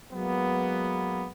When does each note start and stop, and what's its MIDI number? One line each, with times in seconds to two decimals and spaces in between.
0.13 1.29 54
0.13 1.29 56
0.13 1.29 58
0.13 1.29 59